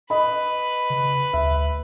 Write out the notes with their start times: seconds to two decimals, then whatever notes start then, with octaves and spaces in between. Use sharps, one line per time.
0.10 B4 D#5 B5
0.90 C#3
1.33 D2 E5